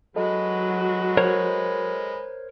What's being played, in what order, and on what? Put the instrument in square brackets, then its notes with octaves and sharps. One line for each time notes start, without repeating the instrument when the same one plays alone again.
[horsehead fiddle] F#3 F#4 [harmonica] G#3 B4 [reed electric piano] A4 D#5
[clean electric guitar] A#4 C5 C#5